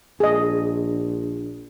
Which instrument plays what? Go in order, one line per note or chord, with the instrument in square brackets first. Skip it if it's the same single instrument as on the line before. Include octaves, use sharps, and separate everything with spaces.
[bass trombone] A#1 [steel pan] G#4 D#5